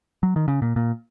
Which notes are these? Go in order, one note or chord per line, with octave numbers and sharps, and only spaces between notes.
F#3
D#3
C#3
A#2
A#2